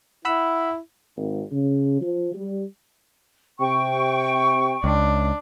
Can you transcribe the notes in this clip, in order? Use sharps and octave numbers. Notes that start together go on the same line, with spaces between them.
E4 F#5 B5 E6
G#1
C#3
F3
G3
C3 G5 C#6
C#2 D4